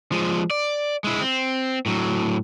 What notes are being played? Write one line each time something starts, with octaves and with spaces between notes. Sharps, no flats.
F3 G#3
D5
G#3 E4
C4
A2 F#3